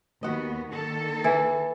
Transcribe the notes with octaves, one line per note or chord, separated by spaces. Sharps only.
D#2 B3 F#4 D#5
D#3 A#3 A4
E3 E4